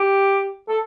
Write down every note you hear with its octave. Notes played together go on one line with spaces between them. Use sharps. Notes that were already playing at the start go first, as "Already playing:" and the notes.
Already playing: G4
A4